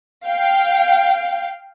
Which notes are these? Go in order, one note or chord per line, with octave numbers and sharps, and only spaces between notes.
F5 G5